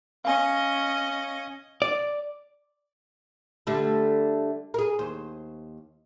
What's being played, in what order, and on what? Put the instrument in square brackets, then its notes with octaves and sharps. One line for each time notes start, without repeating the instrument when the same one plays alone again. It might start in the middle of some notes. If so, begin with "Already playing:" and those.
[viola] C#4 D#5 [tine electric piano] F5 G#5
[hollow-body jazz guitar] D5
[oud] D3 G3 A3
G#4 A#4
D#2 C5